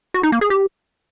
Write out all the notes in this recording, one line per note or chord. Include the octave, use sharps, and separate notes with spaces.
F#4
D#4
A#3
G#4
G4